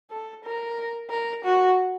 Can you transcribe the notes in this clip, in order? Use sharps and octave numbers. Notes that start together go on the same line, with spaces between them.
A4
A#4
A#4
F#4